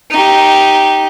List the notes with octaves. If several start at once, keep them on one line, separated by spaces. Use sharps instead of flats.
D#4 G4